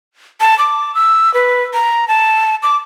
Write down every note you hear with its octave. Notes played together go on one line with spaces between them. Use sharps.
A5
D6
E6
B4
A#5
A5
D6